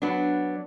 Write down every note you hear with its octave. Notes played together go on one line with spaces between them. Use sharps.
F#3 B3 D4